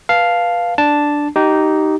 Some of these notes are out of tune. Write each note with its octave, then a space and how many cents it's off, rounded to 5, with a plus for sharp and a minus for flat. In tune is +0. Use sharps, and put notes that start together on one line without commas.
B4 -20 F5 +0 A5 -5
D4 +0 A5 +0
D#4 +0 G4 -20